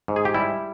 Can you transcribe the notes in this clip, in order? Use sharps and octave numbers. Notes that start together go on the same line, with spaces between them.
G#2
G#4
G4
G3 E4